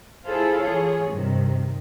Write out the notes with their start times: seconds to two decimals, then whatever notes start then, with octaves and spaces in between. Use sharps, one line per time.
0.24 E4 F4 G#4 A4 C5 F5
0.61 E3 F4 G#4 C#5
1.12 G2 C3 D#3